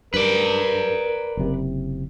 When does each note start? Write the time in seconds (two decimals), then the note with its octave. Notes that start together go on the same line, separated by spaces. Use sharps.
0.14 G2 A#4 B4 D5
1.37 F#1 C3